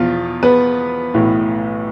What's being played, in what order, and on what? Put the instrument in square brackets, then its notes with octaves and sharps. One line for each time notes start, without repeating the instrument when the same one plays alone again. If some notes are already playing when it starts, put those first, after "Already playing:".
Already playing: [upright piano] E2 B2 F3 F4
B3 B4
B1 A2 E3